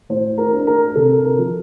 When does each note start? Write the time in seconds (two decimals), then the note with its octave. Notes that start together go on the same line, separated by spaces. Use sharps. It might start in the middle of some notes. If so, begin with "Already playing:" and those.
0.09 A2 C5
0.38 A#4
0.53 D4
0.67 A#4
0.95 C3 A4
1.25 A#4
1.39 F3